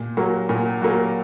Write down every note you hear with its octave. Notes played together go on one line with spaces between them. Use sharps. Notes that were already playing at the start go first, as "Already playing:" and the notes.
Already playing: A#2
F#3 A#3
A#2
F#3 A#3